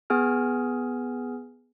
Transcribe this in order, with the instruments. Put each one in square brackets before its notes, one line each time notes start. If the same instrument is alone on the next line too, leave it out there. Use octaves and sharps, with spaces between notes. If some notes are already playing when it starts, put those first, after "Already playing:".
[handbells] B3 G#4 G#5 F6